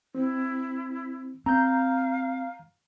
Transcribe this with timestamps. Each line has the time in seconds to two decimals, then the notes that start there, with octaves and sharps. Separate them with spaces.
0.15 C4 E4
1.46 C4 F5 A#5 G6